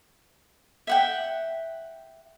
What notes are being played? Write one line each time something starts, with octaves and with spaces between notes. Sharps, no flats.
E5 F#5 G5